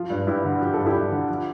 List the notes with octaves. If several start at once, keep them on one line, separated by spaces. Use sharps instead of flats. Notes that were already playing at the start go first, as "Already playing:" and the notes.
Already playing: F3 F4
G2
G2 E4 G4
D3
F3 G4
G2 A4
E4 G4
G2
D3
F3